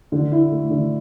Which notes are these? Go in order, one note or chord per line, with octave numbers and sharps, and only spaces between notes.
D3
E4
A3
D3